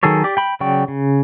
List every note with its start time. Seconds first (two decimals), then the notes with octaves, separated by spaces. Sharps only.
0.03 D#3 F#3 G#4 A4 C#5
0.24 G4 D5
0.37 G5 B5
0.60 C#3 F#3 D5 G5 C#6
0.88 C#3